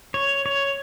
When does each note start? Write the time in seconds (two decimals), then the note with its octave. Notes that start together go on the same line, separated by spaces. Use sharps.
0.14 C#5
0.46 C#5